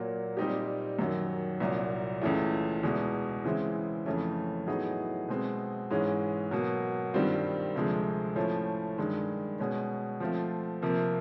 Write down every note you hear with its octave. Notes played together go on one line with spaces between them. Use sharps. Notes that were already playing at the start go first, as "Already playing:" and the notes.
Already playing: A#2 F#3 A#3
A#2 G3 C4 D#4 G4
F#2 D#3 F#3
C2 A#2 F#3
C#2 C#3 E3 A3
E2 B2 G#3
C#3 E3 G#3 C4 E4
F2 C#3 E3 A3 C#4
A2 F#3 B3 D#4 G#4
B2 G#3 C4
G#2 E3 G#3 C#4
B2 F#3 A#3
G2 D#3 G3 C4 F4
D2 C3 F3 G#3
A2 F3 A3 C#4
G2 D#3 G#3
B2 G#3 C#4
F3 A3 C4 F4
C3 F3 A#3